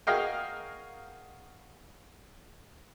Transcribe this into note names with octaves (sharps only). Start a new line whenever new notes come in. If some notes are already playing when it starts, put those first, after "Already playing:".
F#4 G#4 A#4 D#5 F5 G5